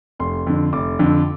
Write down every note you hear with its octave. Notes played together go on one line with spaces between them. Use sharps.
F1 C6
F2 D3
F1 D6
F2 D3